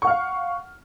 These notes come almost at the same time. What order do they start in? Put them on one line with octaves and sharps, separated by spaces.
C#6 F#5 F6 F5